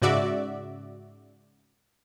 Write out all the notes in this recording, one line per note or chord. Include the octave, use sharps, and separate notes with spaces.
G#2 C#3 F#4 D5 E5